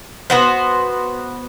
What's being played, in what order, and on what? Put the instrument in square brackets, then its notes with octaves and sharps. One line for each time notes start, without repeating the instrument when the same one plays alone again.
[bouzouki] B3 F#4 C5